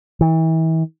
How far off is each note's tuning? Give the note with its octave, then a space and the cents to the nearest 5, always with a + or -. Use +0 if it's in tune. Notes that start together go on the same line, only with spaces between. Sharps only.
E3 -35